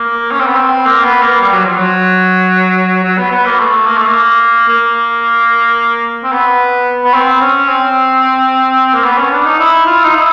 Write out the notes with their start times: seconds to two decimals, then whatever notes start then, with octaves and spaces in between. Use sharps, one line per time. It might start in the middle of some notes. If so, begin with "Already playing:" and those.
Already playing: A#3
0.32 C#4
0.40 C4
0.47 B3
0.56 C4
0.86 A#3
1.05 B3
1.22 A#3
1.41 G3
1.53 F#3
1.65 F3
1.78 F#3
3.04 F#3
3.18 B3
3.31 B3
3.46 A#3
3.60 A3
3.87 A#3
3.97 A3
4.07 A#3
4.68 A#3
6.24 C4
6.32 B3
7.04 B3
7.14 C4
7.41 C#4
7.68 C4
8.94 A#3
9.04 B3
9.18 C#4
9.32 D4
9.45 D#4
9.59 E4
9.87 F4
10.04 D#4
10.14 E4